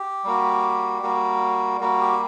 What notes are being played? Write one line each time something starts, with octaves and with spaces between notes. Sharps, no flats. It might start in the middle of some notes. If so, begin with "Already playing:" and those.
Already playing: G4
G3 A#3 F#4
G3 A#3 F#4
G3 A#3 F#4
G4